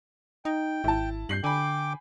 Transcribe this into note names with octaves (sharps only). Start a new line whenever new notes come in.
D#4 G5
G#1 E4 A5
G2 G6 C7 F#7
D3 G5 G#5 B5 D6